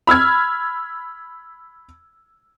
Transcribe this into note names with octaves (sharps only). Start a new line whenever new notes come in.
B5 E6 F6 G#6